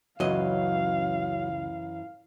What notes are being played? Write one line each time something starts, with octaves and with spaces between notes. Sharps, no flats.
C#2 F#2 E3 F#3 D#5 F5